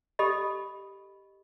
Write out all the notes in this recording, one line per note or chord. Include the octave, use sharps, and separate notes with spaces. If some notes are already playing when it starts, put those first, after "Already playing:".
G4 A4 D#5 B5